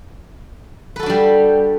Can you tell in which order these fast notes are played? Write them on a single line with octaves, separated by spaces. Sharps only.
B4 A4 F#4 D4 G3